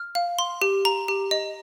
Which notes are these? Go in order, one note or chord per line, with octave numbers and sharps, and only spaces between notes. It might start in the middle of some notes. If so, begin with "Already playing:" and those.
Already playing: F6
F5
C6
G4
A#5
G4
D#5